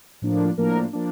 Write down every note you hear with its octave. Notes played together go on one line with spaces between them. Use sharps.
A2 F3 A#3 D4
A2 F3 A#3 D4 A#4
F3 A#3 D4